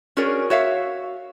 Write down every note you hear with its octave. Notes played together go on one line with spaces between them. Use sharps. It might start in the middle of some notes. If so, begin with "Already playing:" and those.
C#4 F#4 G#4 A#4 C#5 D5
F#4 C#5 E5 F5